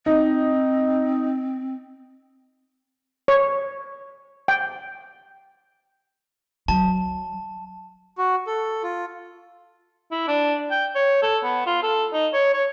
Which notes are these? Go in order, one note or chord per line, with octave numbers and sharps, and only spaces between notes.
C4 D#4
C#5
G5
F#3 A5
F#4
A4
F4
E4
D4
G5
C#5
A4
B3
F4
A4
D#4
C#5
C#5